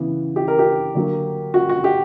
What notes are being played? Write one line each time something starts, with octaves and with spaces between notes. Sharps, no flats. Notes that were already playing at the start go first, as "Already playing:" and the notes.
Already playing: C#3 E3 B3
G4
A#4
G4
D3 F#3 A#3
F#4
F#4
G4